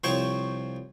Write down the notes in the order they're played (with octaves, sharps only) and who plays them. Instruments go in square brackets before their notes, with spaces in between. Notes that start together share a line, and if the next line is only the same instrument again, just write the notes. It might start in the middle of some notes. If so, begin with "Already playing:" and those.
[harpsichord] C2 F3 C5 C#5 G5 C#6